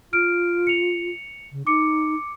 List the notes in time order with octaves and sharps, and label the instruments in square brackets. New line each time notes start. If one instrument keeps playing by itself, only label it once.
[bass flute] F4 [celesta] F6 D7
[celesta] C#7 F7
[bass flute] C#3
[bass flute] D#4 [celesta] D6 C#7